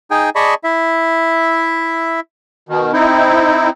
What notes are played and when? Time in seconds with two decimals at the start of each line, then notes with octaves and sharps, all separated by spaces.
0.11 D#4 G#4 G5 G#5
0.35 G#4 D5 D#5 A5 B5 C#6
0.64 E4 E5
2.69 B2 D#3
2.93 C4 D#4 E4